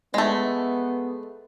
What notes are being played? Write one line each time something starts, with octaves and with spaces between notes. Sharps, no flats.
G#3 A3 B3